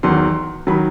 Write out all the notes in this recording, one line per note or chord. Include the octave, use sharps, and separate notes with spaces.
E2 D#3 F#3 C6
D#3 F#3 B5